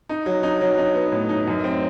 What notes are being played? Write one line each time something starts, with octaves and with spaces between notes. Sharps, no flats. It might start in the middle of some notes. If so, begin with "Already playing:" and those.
D#4
F#3
D#4
F#3
D#4
B3
A2
D#4
F#2
C4